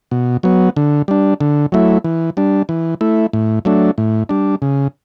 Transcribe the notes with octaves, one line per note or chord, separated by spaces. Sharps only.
B2
F#3 B3
D3
G3 D4
D3
F#3 A3 E4
E3
G3 D4
E3
A3 E4
A2
F#3 A3 D4
A2
G3 D4
C#3